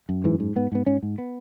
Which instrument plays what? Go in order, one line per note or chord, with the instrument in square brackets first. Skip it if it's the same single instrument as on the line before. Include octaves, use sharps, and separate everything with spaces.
[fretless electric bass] F#2
G#2 E3
G#2
G#2 B3
G#2 B3
G#2 C#4
G#2
B3